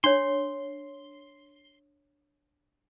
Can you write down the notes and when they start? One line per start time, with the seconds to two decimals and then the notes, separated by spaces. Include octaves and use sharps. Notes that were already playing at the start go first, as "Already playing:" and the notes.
0.04 D4 C#5 C6